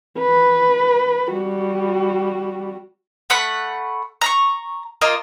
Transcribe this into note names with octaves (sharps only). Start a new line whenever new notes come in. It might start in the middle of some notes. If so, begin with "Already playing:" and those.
B4
G3 F#4
A3 F#5 B5 F#6
A#5 B5 C#6
A#3 F4 D#5